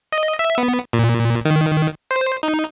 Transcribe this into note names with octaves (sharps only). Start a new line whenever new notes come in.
D#5
E5
B3
A#2
D#3
C5
D#4